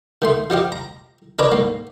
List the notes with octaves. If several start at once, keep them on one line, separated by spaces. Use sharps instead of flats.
D#3 A3 C6
F3 D#4 G4 F5
A#5
D4 A#4 B4 C#5 D5 A#5
G#2 A#3